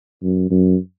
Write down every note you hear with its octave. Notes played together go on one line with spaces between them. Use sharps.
F#2
F#2